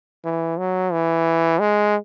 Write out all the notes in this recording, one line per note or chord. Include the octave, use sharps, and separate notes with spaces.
E3
F#3
E3
G#3